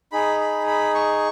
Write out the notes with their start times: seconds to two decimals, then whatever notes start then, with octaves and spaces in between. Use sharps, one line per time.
0.12 D#4 G#4 B5
0.40 B5
0.67 B5
0.95 C#6